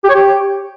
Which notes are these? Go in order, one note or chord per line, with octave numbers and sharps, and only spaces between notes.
G4
C#5
G4